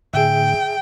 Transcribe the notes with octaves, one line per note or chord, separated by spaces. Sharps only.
A2 D3 G#4 E5 G5